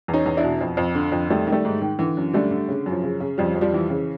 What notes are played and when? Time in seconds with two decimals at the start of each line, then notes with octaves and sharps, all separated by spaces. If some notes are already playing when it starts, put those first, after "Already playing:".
0.08 E2
0.13 C#4 D#4
0.26 E2
0.37 D4 E4
0.43 B2
0.61 F2
0.77 F2
0.95 D3
1.12 F2
1.29 D#3 G3 A3
1.47 D#3
1.52 G3 A3
1.65 G#2
1.82 D#3
1.99 D3 E3
2.17 F#2
2.33 D3 G3 A3
2.51 D3
2.68 C#3
2.86 F#2
2.92 F3
3.03 C#3
3.20 C#3
3.38 F2 F3 G3
3.55 F2
3.61 F3 G3
3.74 E3
3.90 C#3